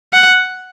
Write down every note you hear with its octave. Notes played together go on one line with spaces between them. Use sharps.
F#5